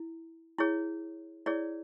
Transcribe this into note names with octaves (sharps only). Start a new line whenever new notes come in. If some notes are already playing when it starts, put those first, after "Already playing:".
Already playing: E4
E4 G#4 C#5
E4 G#4 C#5 D5